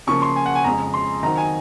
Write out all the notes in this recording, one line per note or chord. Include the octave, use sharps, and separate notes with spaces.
C#3 F3 A#3 C#6
C6
G#5
F#5
G#5
F2 C#3 G#3 A#5
C6
D#3 F#3 C4 D#4 A#5
G#5